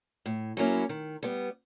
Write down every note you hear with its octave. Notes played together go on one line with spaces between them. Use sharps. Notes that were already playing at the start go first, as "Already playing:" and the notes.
A2
F#3 A#3 C#4 E4
D#3
G3 B3